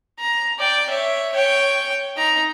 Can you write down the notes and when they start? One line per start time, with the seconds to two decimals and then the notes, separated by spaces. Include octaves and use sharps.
0.19 A#5
0.59 D5 G5
0.89 C#5 E5
1.33 C#5 G5
2.16 D#4 A#5